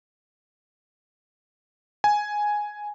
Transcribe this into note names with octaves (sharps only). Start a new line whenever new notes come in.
G#5